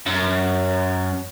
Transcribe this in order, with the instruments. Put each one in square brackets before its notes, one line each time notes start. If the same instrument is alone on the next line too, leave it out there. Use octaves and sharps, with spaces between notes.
[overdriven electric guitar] F#2